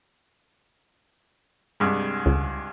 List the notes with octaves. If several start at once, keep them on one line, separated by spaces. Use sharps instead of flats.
C2 G2 G#3
C#2